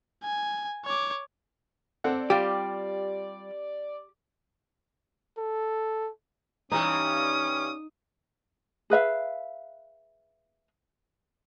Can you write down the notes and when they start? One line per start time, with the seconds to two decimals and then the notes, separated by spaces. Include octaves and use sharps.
0.24 G#5
0.86 C#5 D6
2.04 C4 A4 D5 F#5
2.30 G3 F4 G4
5.38 A4
6.72 G2 E3 G3 C#4 D#4 D#6
8.90 G#4 B4 E5 F5